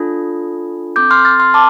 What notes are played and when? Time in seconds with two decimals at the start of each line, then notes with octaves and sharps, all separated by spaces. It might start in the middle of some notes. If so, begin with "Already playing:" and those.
Already playing: D4 F4 A4
0.96 C4 A4 D6 G6
1.11 C6 F6
1.25 F6 A6
1.40 C6 F6
1.54 A5 D6